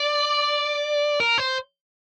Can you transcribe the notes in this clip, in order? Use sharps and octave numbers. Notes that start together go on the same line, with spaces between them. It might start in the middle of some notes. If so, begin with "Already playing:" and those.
Already playing: D5
A#4
C5